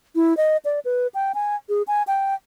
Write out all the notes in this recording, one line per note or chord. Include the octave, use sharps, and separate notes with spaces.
E4
D#5
D5
B4
G5
G#5
G#4
G#5
G5